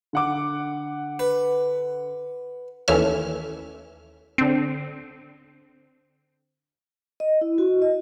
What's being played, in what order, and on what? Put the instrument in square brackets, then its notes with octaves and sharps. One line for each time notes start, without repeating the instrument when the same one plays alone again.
[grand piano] D3 F#5 D6
[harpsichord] B4
[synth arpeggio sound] D#2 E3 A3 C#4 E5 F6
D3 C4
[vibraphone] D#5
E4
F#4
D#5